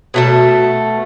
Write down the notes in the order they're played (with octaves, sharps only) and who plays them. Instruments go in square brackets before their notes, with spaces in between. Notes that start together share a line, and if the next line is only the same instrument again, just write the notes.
[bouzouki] B2 A3 A5